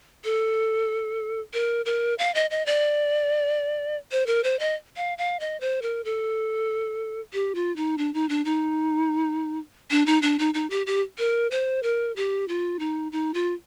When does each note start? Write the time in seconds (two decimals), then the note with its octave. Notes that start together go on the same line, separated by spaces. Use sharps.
0.24 A4
1.54 A#4
1.86 A#4
2.19 F5
2.35 D#5
2.51 D#5
2.66 D5
4.12 C5
4.27 A#4
4.44 C5
4.60 D#5
4.97 F5
5.18 F5
5.40 D#5
5.61 C5
5.82 A#4
6.05 A4
7.33 G4
7.55 F4
7.76 D#4
7.98 D4
8.14 D#4
8.29 D4
8.45 D#4
9.91 D4
10.06 D#4
10.22 D4
10.39 D#4
10.54 D#4
10.70 G4
10.87 G4
11.18 A#4
11.51 C5
11.83 A#4
12.16 G4
12.48 F4
12.79 D#4
13.12 D#4
13.34 F4